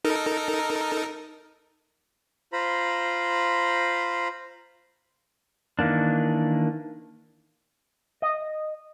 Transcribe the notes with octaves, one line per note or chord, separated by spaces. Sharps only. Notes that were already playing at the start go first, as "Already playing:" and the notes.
D#4 A4 A#4
F4 C5 A#5 B5
D#3 E3 A#3 D4
D#5